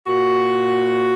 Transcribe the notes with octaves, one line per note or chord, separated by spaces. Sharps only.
A#2 F#4